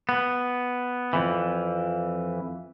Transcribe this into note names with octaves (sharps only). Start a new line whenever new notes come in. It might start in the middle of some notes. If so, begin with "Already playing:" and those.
B3
F2 E3